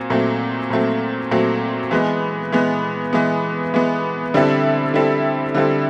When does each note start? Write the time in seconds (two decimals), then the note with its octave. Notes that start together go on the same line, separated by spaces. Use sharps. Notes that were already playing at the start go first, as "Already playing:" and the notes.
Already playing: A#2 F#3 C4
0.10 A#2 F#3 A3 C4
0.70 A#2 F#3 A3 C4
1.31 A#2 F#3 A3 C4
1.91 E3 G#3 B3
2.52 E3 G#3 B3
3.13 E3 G#3 B3
3.74 E3 G#3 B3
4.34 D3 G3 C4 E4 A4
4.94 D3 G3 C4 E4 A4
5.55 D3 G3 C4 E4 A4